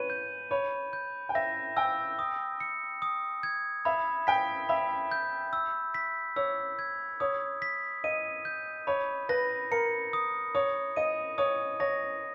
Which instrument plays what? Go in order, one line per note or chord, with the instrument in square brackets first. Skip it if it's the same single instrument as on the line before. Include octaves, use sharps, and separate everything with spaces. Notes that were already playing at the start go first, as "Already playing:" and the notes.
Already playing: [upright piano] B4 C#5 [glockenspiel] D#7
[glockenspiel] G6
[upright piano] C#5 [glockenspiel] B5
[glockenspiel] G6
[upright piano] G5
[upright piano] E5 [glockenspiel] A#6
[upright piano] G5 [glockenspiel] E6
[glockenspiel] D#6
C#7
D#6
G#6
[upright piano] E5 [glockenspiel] B5
[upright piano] G5 [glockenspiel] B6
[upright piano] E5 [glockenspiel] B5
[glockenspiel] G6
E6
B6
[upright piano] C#5 [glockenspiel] E6
[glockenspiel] G#6
[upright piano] C#5 [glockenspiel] D#6
[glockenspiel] B6
[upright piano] D#5 [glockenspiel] D#7
[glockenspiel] G6
[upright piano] C#5 [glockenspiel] B5
[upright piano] B4 [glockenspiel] A#6
[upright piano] A#4 [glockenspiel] C#7
[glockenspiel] D#6
[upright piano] C#5 [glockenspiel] D#6
[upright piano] D#5 [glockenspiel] D#7
[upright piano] C#5 [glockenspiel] D#6
[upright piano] C#5 [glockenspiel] A#6